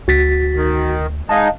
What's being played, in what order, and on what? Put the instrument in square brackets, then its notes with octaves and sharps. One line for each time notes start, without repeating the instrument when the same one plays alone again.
[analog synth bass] D2 [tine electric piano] F#4 A6 B6
[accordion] D#3
[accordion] G#3 D#4 [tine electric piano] D#5 F5 A5